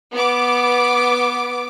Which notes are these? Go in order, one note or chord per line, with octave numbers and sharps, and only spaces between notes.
B3 D6